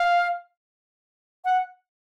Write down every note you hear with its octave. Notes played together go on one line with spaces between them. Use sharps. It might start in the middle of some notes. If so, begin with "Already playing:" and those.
Already playing: F5
F#5